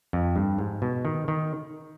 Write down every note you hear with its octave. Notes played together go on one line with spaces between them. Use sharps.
F2
G2
G#2
B2
D#3
D#3